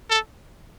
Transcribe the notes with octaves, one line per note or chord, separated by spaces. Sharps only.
A4